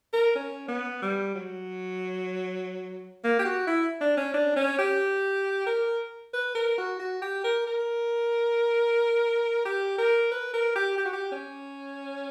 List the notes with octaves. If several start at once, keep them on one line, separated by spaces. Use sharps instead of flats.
A#4
C#4
B3
G3
F#3
A#3
G4
F#4
E4
D4
C#4
D4
C#4
G4
A#4
B4
A#4
F#4
F#4
G4
A#4
A#4
G4
A#4
B4
A#4
G4
G4
F#4
G4
C#4